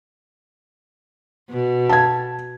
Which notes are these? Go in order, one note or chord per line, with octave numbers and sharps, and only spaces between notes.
B2
A5 G#6